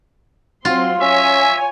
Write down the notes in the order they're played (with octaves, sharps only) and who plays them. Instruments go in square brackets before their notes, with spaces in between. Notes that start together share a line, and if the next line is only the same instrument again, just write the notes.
[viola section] F#3 C4 C6 [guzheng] F4 [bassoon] F#4
[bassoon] C#4 [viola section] C#5 G#5 [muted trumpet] E5